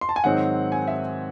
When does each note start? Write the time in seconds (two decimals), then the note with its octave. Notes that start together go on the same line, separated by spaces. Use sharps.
0.01 C6
0.09 A5
0.16 G#5
0.24 G#2 D#3 F#3 C4 D#4 F#5
0.72 G#5
0.88 E5